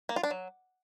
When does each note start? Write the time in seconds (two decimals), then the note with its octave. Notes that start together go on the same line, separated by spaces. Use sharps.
0.09 A#3
0.16 F4
0.23 D4
0.31 F#3